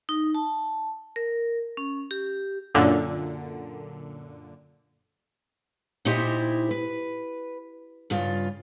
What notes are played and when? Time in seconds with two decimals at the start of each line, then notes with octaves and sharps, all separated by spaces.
0.09 D#4
0.35 A5
1.16 A#4
1.77 C#4
2.11 G4
2.75 F#2 A#2 D3
6.05 A#2 D#4 E4 G4 C5 D#5
6.71 B4
8.10 G2 C#3 F4